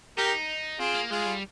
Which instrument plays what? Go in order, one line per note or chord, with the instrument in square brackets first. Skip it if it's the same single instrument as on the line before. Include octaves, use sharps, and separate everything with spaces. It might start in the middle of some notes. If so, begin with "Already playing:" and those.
[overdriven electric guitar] D#4 [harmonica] G4 A#4
[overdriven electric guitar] C4 [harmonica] F4 G#4
[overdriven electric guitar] A#3
[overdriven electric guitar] G#3 [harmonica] F4 G#4
[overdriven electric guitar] G3